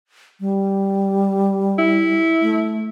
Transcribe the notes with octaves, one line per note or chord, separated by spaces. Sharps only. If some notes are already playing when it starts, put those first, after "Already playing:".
G3
E4
A3